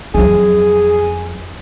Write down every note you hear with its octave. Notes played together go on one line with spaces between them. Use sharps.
F2 F#3 G#4